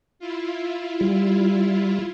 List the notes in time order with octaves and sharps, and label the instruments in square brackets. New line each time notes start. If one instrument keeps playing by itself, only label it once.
[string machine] E4 F4
[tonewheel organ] G3